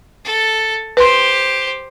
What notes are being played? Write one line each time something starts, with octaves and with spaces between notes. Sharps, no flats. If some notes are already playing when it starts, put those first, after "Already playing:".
A4
G4 B4 C5 C6